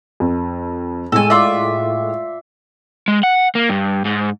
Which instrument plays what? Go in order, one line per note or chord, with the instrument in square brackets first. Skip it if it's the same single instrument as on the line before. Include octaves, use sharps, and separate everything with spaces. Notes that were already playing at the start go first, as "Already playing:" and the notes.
[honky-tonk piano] F2
[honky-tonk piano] A2 G#3 [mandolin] A4 G#5
[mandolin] F4 D5 E5
[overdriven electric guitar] G#3
F#5
A#3
G2
G#2